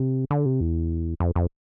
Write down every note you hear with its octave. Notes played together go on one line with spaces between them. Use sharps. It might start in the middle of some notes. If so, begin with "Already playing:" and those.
Already playing: C3
D3
C3
E2
F2
F2